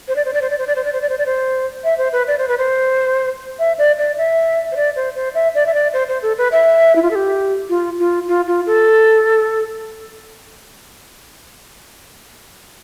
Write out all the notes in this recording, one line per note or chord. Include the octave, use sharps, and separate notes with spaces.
C5
D5
C5
D5
C5
D5
C5
D5
C5
D5
C5
D5
C5
D5
C5
E5
C5
B4
D5
C5
B4
C5
E5
D5
D5
E5
C5
D5
C5
C5
E5
D5
E5
D5
C5
C5
A4
B4
E5
E4
F4
A4
G4
F4
F4
F4
F4
A4